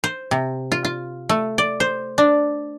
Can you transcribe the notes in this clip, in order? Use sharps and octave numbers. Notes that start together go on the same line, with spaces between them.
C5
C3
F4
F4
A3
D5
C5
D4